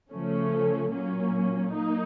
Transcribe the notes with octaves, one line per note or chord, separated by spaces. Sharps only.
C#3 F3 A3 C#4
A#2 F#3 A#3 C#4
F#3 A#3 D#4